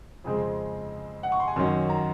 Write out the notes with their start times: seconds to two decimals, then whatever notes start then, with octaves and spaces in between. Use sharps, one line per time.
0.24 F2 C#3 G#3 C4 G#4
1.23 F#5
1.32 C#6
1.40 C6
1.48 G#5
1.56 F#2 D#3 F#3 C#4 C6
1.89 A#5